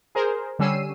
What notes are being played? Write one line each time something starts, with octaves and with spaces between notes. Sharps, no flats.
G#4 A#4 C5
D3 G3 C#4 E6 C7 D#7